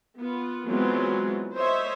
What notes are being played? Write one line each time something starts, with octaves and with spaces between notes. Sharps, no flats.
B3 F4
E3 F#3 G#3 B3 C4 F4
C5 C#5 D#5 E5